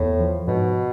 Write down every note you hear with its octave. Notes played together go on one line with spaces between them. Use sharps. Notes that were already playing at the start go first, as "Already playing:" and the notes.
Already playing: E2 A2
F3
G#2 B2